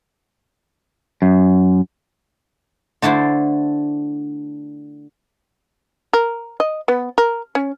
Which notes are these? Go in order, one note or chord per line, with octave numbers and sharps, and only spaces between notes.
F#2
D3 A3 D4 E4 C5
A#4
D#5
B3
A#4
C#4